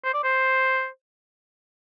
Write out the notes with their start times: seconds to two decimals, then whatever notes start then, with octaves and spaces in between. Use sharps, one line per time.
0.04 C5
0.14 D5
0.24 C5